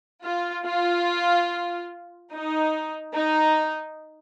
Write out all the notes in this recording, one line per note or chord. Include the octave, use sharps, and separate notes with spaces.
F4
F4
D#4
D#4